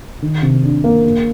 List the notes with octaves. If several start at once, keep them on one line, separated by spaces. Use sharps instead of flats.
D#3
C3
D4
A#3
A#3